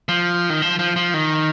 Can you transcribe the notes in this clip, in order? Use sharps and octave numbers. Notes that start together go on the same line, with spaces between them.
F3
D#3
F3
F3
F3
D#3